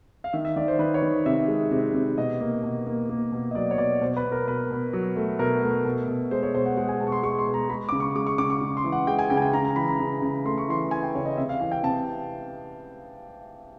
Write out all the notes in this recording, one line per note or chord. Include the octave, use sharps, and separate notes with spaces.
F5
D#3 E5
E5
D#3 D5
C5
D#3 B4
C#5
D#3
C3 E5
G#3
C3
C3
B2 D#5
A#3
B2
A#3
A#3
B2
D#5
F#3 D5
C#5
B2 D5
B2 C5
B4
B2
A#4
B2 B4
B2
F#3
A3
B2 A#4
A3
B2
B2
G#3 C5
C#5
B2 C5
F#5
G#3 F#5
G#5
B2 A5
C#6
C6
G#3 C#6
C6
B2
A#5
G#3 B5
C#3 D6
C#6
G#3 D6
C#6
C#3 D6
C#6
C#3
C6
E3
F#5
G#3 G5
G#5
C#3 G5
G#5
G5
C#3 A#5
A#5
E3 B5
A#5
C#3
C#3
A3 C6
C#6
E3 C6
E3 G#5
G5
C#3 C#5
D#5
C3 E5
F5
E3 F5
G5
C3 A5